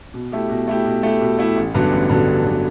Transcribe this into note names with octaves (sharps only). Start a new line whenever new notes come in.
B2
A3 E4 G4
B2
A3 E4 G4
B2
A3 E4 G4
B2
A3 E4 G4
A1
G2 D3 F#3 B3
A1
G2 D3 F#3 B3
A1
D3 F#3 B3